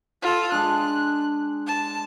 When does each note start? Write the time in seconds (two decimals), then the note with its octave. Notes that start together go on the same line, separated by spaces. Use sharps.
0.22 F4 A4
0.52 G#3 D4 F#6
1.67 A5